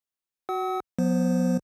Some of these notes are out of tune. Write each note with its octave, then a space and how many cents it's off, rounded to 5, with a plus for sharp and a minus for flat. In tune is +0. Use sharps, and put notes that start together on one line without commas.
F#4 +0 F#5 +35 E6 -45
F#3 -40 B3 -5 C5 -5